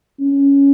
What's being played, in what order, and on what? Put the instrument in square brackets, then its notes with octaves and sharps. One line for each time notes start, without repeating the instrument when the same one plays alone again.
[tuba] C#4